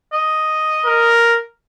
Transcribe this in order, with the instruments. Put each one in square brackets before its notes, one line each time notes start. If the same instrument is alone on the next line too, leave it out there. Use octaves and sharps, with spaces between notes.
[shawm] D#5
[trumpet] A#4